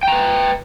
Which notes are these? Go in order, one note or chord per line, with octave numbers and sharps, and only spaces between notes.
B4 G5 A#5